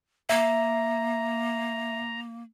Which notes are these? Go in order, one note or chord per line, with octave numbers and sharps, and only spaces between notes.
A#3 E5 A#5